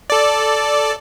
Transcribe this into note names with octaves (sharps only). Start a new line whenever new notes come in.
A4 D5